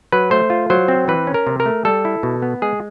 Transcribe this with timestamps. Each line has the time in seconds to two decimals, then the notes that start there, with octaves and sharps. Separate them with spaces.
0.12 F#3 B4
0.31 A3 C5
0.50 F4
0.70 F#3 C5
0.88 C4
1.08 E3 B4
1.27 C#4
1.34 A#4
1.47 C3
1.60 A#4
1.66 A3
1.85 G3 A4
2.05 E4
2.23 B2
2.42 B3
2.62 G#3 G#4